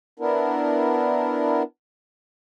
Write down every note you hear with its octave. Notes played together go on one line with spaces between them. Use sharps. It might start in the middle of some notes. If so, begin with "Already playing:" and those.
B3 D4 E4 A#4